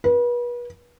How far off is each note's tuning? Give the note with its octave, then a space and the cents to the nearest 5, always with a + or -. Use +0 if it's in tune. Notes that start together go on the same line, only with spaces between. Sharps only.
B4 -35